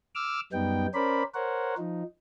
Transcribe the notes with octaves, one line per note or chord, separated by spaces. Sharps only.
D6 E6 F6
F#2 G3 B3 D#4 G5
C#4 A#4 C5 D5 B5
A#4 C5 C#5 F#5
F3 D#4